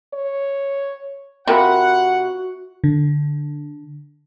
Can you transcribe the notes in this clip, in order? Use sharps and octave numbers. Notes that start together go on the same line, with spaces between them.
C#5
C3 F4 F#4 A#4 F#5 B5
D3